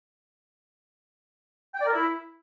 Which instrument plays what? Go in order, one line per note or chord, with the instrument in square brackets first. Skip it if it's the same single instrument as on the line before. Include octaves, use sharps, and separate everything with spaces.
[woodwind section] G5
D5
A#4
E4